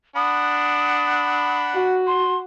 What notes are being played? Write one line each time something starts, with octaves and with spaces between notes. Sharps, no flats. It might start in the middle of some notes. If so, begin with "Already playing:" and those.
D4 F#5 B5 D#6
F#4
C6